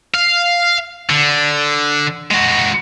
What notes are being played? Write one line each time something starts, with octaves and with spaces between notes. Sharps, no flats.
F5
D3
G#3 F#4